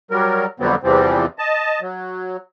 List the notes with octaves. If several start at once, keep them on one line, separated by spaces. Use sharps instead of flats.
F#3 G3 A#4
F2 D3 F#3 G3 B3 C4
E2 C3 E3 F3 G3 C4
D#5 A5
F#3